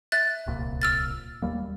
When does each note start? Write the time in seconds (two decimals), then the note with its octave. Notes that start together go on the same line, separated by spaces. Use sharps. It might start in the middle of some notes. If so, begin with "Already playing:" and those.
0.12 E5 F#6 A6
0.46 D1 C2 A#2
0.82 E6 F6 A6
1.42 D#2 G3 A#3